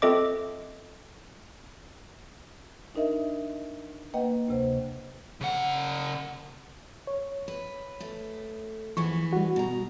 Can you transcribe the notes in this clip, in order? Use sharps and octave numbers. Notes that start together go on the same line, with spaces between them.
C4 F4 A4 D#5 E5 D6
D4 D#4 A#4 D#5 E5
A#3 B4 D#5 F#5 G5
D2 C3 C5
C#3 F#5
C#5
B4
A3
E3 F3 G#3 B3 C#6
G3 F#4
B2 A#5